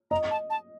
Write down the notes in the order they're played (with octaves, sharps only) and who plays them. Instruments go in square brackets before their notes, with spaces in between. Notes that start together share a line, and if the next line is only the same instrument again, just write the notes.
[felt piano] D#5 [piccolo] A#5
[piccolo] A5
A5